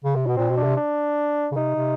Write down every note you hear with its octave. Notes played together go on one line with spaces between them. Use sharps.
C#3
C3
B2 B3
A#2 C4
B2
D4
C3
D4
C#3
C3 D#4
C3